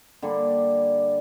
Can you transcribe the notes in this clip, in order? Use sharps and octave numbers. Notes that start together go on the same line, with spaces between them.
D3 G3 A#3 D4